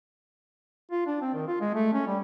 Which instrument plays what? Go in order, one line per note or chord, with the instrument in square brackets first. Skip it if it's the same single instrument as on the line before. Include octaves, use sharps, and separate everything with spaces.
[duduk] F4
D4
C4
D#3
F4
G#3
A3
C#4
G3